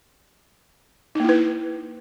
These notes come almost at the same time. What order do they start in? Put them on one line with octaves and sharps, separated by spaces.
D#4 A#3 E4 B4